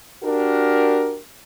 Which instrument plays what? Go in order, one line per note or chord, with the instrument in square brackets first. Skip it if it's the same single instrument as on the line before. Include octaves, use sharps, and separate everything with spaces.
[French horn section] D4 F#4 G4 A#4